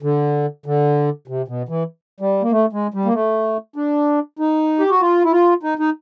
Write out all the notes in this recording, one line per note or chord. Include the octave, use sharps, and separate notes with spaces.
D3
D3
C3
B2
E3
G3
A#3
A3
G#3
G3
A#3
A3
D4
D#4
G4
F#4
F4
E4
F4
D#4
D#4